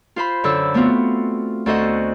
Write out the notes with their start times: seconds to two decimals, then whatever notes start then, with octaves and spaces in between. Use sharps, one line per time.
0.16 F4 C5 B5
0.44 F#2 D3 A4 E6
0.74 A3 B3 C4 F4 F#4
1.66 D2 F#4 A4 C5 D#5 F#5